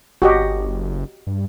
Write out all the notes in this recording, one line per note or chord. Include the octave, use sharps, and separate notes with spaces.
G1 F#4 G4 D#5
F#1
G2